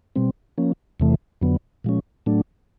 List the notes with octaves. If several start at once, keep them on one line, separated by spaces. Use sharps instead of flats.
B2 G3 C4
F3 A#3 C#4
E2 C3 E3 A3
F2 D3 F#3 B3
A#2 F3 G#3 C#4
A2 F#3 A3 D4